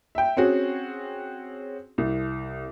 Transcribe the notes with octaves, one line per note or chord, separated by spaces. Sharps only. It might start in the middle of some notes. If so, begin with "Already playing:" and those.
E5 G5
C4 C#4 F#4 G#4
C2